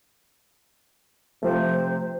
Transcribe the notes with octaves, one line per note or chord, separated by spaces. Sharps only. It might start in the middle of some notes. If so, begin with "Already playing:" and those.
C3 F3 A3 C5